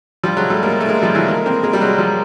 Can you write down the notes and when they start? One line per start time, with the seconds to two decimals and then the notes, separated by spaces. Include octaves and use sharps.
0.23 F3 G3
0.37 F#3 G#3
0.50 G3 A3
0.63 G#3 A#3
0.80 A3
0.89 G#3 A#3
1.02 F3 G3
1.15 E3 F#3
1.28 G#3 A#3
1.46 A#3 C4
1.63 G#3 A#3
1.73 G3
1.81 F#3 G#3
1.98 F3 G3